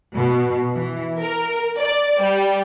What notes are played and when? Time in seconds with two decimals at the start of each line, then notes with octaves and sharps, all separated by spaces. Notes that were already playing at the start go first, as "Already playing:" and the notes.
0.15 B2
0.74 E3
1.21 A#4
1.79 D5
2.22 G3